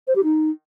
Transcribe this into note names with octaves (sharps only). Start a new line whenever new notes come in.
C5
G4
D#4